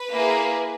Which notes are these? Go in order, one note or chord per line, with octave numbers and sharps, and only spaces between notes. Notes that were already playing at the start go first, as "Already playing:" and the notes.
Already playing: B4
A#3 E4 G#4